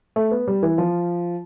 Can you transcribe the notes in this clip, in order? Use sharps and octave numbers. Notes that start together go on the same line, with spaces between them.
A3
B3
G3
E3
F3